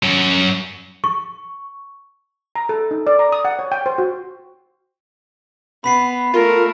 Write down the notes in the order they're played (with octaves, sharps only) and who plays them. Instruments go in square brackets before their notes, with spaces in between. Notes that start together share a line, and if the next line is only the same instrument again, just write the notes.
[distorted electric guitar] F#2
[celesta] C#6
[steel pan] A#5
A4
D#4
D5
A#5
D#6
F#5
C#5
G5
C5
F#4
[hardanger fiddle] B3 [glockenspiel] B5 B6 C7
[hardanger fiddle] A3 [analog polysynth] F4 [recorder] A#4